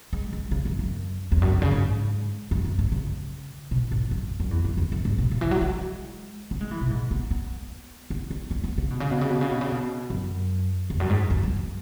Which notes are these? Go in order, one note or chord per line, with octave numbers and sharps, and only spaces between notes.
G#3
G#3
C#3
F#2
F#2
E2
F#2
G#2
C#3
G#2
F#2
F#2
G#2
C#3
B2
G#2
F#2
F#2
E2
F#2
E2
F#2
G#2
B2
C#3
E3
F#3
G#3
B3
G#3
E3
B2
G#2
B3
B3
B3
C#4
C#4
B3
C#3
B2
C#3
B2
C#3
B2
C#3
B2
C#3
B2
F#2
E2
F#2
G#2
E2
F#2